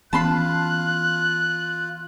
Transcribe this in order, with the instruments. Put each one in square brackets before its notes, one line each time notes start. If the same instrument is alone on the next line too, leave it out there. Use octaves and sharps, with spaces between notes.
[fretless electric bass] E3 B3 C#4 [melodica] F4 [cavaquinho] A5 B5 C6 [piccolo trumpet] F#6